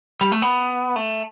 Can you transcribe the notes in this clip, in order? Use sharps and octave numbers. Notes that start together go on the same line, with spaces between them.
G3
A3
B3
A3